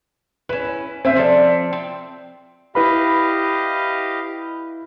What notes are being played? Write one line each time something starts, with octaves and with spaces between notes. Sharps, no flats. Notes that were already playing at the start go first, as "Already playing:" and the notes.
C#4 E4 B4
A#2 C4 E5 G#5
F3 A4 D5
C4
E4 G4 B4 D#5 F5 B5